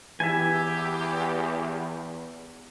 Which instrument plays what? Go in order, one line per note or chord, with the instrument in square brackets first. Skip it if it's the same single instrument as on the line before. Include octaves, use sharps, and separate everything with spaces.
[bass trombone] E2 [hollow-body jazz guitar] E3 E4 [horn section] G4 [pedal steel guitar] E5 G#5